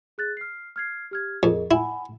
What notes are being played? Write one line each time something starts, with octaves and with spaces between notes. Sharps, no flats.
G#4 F#6 A6
F6 C7
F6 G#6 C7
G4 F6 G#6
F2 G#4 A#4 D#5
E4 F#5 G#5 B5